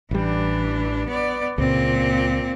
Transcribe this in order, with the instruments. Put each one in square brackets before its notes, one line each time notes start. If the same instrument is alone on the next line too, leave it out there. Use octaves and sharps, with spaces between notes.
[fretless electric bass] A1 G3 [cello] E3 D4
[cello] B3 D5
[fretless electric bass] C#2 [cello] A#2 C4